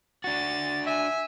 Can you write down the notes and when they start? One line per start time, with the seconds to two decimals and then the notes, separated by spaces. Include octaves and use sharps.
0.24 D4 F#4 A6
0.87 E5 G#5